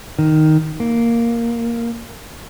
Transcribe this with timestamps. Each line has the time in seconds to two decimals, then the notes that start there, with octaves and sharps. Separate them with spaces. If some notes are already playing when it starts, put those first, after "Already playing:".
0.19 D#3
0.80 A#3